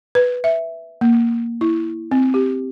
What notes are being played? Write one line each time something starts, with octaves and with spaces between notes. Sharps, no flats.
B4
E5
A#3
E4
C4
G4